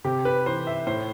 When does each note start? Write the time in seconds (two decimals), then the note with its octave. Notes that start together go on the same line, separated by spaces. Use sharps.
0.04 C3 G4
0.25 B4
0.46 E3 C5
0.67 E5
0.87 A2 C5